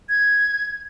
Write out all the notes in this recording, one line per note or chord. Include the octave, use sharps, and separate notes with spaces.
G#6